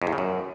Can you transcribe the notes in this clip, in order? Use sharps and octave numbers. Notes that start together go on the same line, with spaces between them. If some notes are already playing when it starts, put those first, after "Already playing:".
F2
E2
C#3
F#2